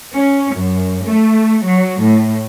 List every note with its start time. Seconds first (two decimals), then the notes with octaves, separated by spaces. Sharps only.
0.13 C#4
0.54 F#2
1.05 A3
1.64 F#3
2.01 A2